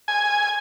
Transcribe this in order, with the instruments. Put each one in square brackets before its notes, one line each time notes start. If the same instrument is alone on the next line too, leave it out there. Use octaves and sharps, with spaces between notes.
[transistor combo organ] G#5